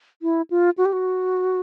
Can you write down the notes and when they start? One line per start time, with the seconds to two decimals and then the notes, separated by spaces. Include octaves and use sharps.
0.22 E4
0.50 F4
0.78 F#4
0.85 G4
0.93 F#4